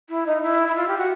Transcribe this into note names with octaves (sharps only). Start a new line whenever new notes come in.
E4
D#4
E4
E4
F4
G4
F#4